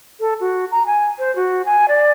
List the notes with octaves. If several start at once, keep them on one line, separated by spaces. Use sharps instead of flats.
A4
F#4
A#5
G#5
C5
F#4
G#5
D5